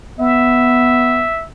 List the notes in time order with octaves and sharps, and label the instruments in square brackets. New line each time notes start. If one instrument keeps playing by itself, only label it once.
[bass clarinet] B3 [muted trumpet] E5